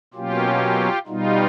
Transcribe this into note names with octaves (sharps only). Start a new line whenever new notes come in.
B2 F#3 A#3 C#4 F4 G4
B2 G3 B3 D#4 F4